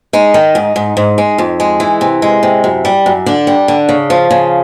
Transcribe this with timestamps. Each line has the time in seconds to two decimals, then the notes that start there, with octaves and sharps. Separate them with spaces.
0.13 G#3 D#4
0.34 D#3
0.55 G#2
0.76 G#2
0.97 G#2
1.18 G#3
1.38 F2
1.60 G#3
1.80 E3
2.01 C3
2.22 G#3
2.43 C3
2.64 F#2
2.85 G3
3.06 F#2
3.26 D3 D4
3.47 G3
3.68 D3
3.89 C#3
4.10 F3
4.31 C#3